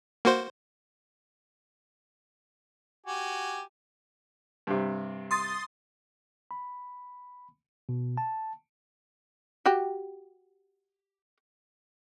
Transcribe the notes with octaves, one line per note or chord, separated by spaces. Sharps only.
A#3 F#4 C5
F#4 G4 G#5
G2 C3
C6 D#6 A6
B5
B2
A5
F#4 G4